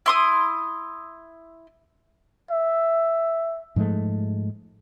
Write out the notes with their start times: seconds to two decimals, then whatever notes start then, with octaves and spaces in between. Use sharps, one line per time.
0.06 E4 C6 D#6
2.51 E5
3.76 G#2 F3 G#3 A3